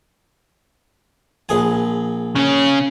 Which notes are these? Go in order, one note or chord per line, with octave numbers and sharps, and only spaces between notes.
A#1 G#4 G#5
C#3 C#4